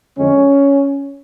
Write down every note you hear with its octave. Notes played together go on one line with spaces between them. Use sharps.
F2 D3 G#3 C#4